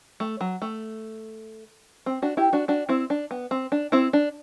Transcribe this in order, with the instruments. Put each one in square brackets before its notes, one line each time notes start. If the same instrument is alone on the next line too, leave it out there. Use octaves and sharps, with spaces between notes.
[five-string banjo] A3
F#3
A3
C4
D4 F#4
E4 G4
D4 F#4
D4 F#4
C4 E4
D4
B3
C4
D4
C4 E4
D4